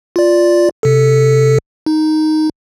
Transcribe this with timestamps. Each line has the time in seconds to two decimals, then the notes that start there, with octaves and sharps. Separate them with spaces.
0.16 F4 D5
0.83 C3 A4
1.86 D#4